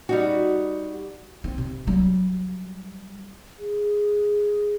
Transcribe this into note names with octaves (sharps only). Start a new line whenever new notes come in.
G3 D#4 F#4
C4
C3
F#3 G3
G#4